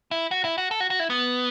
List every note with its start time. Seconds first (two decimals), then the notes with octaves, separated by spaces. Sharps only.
0.11 E4
0.31 F#4
0.44 E4
0.58 F#4
0.71 A4
0.80 F#4
0.90 F#4
1.00 E4
1.10 B3